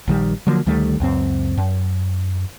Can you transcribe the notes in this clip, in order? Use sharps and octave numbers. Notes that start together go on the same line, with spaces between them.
A#1 D#3 G3
D3 F3 F#3 A#3
D2 D#3 G3 A3
C#2 F#2 C4
F#2